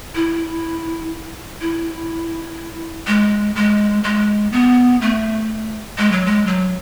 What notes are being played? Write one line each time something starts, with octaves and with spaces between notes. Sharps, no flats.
E4
E4
G#3
G#3
G#3
B3
A3
G#3
F#3
G#3
F#3